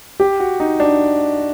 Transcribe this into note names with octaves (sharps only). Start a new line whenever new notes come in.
G4
F#4
D#4
D4